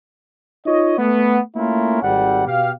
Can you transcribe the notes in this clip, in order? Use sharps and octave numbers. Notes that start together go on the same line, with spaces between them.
D#4 F4 C#5 D#5
A3 B3
A3 A#3 C#4 E4 F4 A#4
G#1 G3 F#5
B2 G4 F5